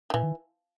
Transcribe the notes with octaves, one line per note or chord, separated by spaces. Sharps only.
D#3
A#2 E3
D#3